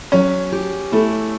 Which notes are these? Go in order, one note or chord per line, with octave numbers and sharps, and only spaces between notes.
F#3 C#4
G4
A3 E4